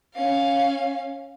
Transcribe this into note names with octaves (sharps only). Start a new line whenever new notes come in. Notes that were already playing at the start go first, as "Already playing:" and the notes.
C#4 F5